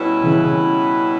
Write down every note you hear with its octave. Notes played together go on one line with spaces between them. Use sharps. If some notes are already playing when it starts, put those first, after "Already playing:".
Already playing: B2 G3 C#4 E4 B4
C#3 E3